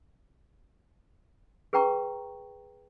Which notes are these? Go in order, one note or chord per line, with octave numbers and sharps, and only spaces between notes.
G#4 B4 G5 A#5 C#6